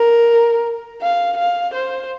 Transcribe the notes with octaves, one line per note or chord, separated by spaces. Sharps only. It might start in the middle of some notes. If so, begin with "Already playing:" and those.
Already playing: A#4
F5
F5
C5